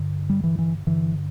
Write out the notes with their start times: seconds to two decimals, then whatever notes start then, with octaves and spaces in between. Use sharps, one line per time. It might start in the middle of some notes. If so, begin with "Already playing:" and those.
Already playing: G2 D3
0.30 G3
0.44 E3
0.59 E3
0.87 G2 D3 E3